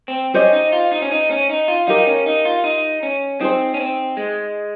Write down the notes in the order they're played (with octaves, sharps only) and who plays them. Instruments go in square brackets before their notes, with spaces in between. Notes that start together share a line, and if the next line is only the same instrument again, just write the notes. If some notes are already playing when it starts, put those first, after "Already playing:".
[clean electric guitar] C4
[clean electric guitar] C#4 [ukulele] G4 C5 D#5
[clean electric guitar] D#4
F4
D#4
C#4
D#4
C#4
D#4
F4
[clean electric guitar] D#4 [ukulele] G4 A#4 F5
[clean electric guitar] C#4
D#4
F4
D#4
C#4
[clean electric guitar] C4 [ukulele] D#4 G#4 C5
[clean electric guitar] C#4
C4
G#3